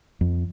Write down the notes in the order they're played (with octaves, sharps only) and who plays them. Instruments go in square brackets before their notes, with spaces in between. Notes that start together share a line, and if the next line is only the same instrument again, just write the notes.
[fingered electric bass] F2